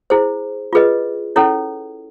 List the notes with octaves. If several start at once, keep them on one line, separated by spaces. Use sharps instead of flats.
E4 G#4 C5
F4 G#4 B4 D#5
C#4 E4 A4 C#5